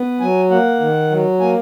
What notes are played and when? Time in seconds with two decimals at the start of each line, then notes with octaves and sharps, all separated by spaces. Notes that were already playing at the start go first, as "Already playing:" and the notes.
Already playing: B3
0.20 F#3 G#5
0.50 A#3 F#5
0.80 D#3
1.11 F#3
1.40 A#3 G#5